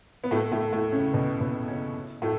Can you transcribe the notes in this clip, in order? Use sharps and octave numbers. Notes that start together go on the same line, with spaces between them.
B3
A2 A3
A2 A3
A2 A3
C#3 C#4
B2 B3
B2 B3
C#3 C#4
A2 A3